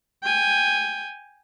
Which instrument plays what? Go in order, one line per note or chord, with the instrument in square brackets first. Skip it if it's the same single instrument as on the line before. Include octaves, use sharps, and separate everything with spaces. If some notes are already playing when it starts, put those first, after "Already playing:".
[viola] G5 G#5